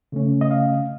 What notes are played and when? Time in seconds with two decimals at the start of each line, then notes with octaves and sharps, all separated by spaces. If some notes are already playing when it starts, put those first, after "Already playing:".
0.12 C#3 A3 C#4
0.41 D#5
0.51 F5